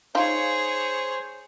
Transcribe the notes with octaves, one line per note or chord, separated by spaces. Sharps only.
D#4 F4 G#4 C5 C#5